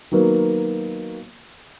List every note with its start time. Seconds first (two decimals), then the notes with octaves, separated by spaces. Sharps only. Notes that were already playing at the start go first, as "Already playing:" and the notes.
0.11 D#3 F#3 A#3 B3